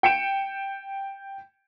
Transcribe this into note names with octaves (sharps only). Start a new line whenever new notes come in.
G5 C#7 D7 E7